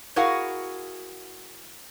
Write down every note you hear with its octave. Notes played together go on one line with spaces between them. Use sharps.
E4 F#4 G#4 A#4 F5 F#5